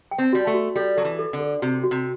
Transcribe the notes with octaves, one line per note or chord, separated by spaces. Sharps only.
G5
C4
G3 F#4
A3
F#4
G3 A4
F#3 A4
E3
A4
D3
A4
C3 F#4
F#4
C3